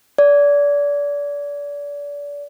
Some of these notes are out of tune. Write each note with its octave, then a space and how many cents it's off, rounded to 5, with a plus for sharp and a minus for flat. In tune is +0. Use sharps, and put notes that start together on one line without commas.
D5 -30